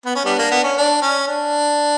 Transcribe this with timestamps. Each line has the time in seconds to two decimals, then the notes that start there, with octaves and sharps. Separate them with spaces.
0.06 B3
0.16 C#4
0.25 G3 B3 D4
0.39 A#3
0.51 B3
0.64 C#4
0.77 D4
1.02 C#4
1.27 D4